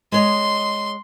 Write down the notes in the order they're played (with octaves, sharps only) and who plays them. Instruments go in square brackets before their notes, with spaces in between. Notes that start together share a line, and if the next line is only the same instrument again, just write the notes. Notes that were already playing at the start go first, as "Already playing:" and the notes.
[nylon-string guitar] G#3 C#5 D#5 [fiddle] C6